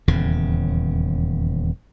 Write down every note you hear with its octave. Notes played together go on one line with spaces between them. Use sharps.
D#1 E2 C#3